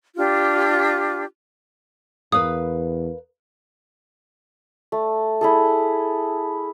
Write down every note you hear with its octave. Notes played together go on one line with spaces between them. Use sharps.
D4 F4 G4
E2 A#4 B4 F5 D#6
A3
E4 G#4 A4